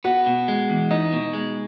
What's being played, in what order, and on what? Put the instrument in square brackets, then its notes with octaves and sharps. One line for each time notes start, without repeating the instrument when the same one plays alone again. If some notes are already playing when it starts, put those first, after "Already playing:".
[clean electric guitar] B3 [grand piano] F#4 F#5
[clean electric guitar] B2
G#3
E2
[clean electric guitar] B3 [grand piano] D#4 D#5
[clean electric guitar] B2
G#3